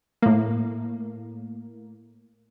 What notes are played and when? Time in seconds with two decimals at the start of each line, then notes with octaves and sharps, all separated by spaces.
0.22 A2 A#3